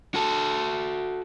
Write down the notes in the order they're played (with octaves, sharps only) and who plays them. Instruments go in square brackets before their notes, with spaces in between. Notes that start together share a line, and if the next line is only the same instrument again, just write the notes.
[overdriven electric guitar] F#4 A4